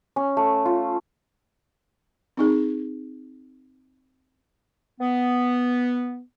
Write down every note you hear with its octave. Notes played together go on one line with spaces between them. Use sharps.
C#4
A3
F4
C4 D#4 G#4
B3